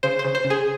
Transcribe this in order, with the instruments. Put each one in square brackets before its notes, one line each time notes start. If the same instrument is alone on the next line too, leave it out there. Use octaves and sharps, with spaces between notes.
[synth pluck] C#3 C5
C5
C#3
C5
C#3
G#4